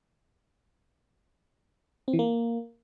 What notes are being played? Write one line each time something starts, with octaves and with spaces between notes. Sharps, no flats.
C4
E3
A#3